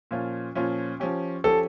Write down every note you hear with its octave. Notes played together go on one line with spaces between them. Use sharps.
A#2 F3 C#4 F4
A#2 F3 C#4 F4
F3 C#4 G4
F3 C#4 G4 A4